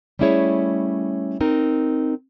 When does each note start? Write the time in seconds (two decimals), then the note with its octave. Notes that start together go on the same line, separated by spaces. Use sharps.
0.19 G3 A3 C#4 E4 G#4 C#5
1.40 C4 D#4 A#4